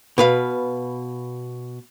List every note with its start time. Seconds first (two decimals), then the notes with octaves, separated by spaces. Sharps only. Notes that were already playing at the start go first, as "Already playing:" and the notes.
0.18 B2 B4 F5